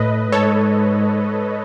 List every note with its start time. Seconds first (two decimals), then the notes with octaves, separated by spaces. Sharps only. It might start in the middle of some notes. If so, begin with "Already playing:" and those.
Already playing: A2 B4 D#5
0.32 G#2 A4 C#5